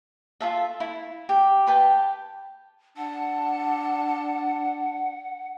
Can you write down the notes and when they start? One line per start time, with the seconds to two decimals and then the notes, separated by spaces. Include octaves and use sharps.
0.41 F4 A4 E5
0.80 E4
1.29 G4
1.67 G4 B4 G5 A5
2.97 D4 F#5 A5